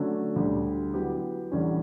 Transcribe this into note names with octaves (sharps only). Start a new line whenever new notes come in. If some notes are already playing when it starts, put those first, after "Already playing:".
Already playing: D3 F#3 A3 C#4
D2 D3 G3
F#3 B3 E4 G4
E2 D3 G3 C#4